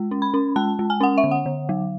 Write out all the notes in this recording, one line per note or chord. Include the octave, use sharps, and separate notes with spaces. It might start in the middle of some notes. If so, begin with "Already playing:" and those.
Already playing: G#3
C#4
B5
C#4
G#3 A5
G#3
G#5
C#4 F#5
E5
D3
F#5
D3
F#3